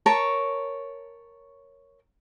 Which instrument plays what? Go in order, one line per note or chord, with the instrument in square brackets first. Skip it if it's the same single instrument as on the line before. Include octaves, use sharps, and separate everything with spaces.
[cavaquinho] A#4 C#5 A5 C#6